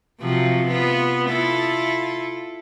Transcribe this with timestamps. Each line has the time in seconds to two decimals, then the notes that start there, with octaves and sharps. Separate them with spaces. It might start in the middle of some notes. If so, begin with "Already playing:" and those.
0.20 C3 F3 F#3
0.68 B3 F4
1.28 E4 F4 A4